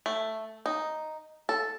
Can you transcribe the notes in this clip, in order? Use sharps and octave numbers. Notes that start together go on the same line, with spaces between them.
A3
D#4
A4